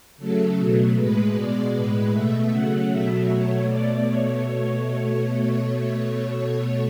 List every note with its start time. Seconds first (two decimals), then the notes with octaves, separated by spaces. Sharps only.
0.18 C#3 F#3 A3 A4
0.56 B2 F#3 A3
0.95 A2 G#3 B4
1.33 B2 G#3 D5
1.73 A2 G#3 B4
2.11 B2 A3 E5
2.49 C#3 F#3 A3 F#5
2.88 B2 F#3 A3 E5
3.27 B2 F#3 A3 C#5
3.66 B2 A3 D5
4.05 B2 A3 C#5